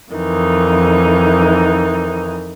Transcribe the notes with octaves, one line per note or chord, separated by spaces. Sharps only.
F2 D#3 E3 D#4